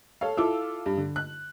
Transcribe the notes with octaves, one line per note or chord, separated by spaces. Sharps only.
A4 C#5 F5
E4 F4 A4 F5 D6 E6
G2
D3
F#6